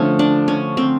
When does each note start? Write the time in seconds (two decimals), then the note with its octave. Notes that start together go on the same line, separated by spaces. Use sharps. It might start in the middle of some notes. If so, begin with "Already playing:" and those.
Already playing: D3 F3 A3 C#4
0.19 D4
0.48 C#4
0.77 C4